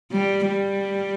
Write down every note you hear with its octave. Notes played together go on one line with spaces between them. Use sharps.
G3
G3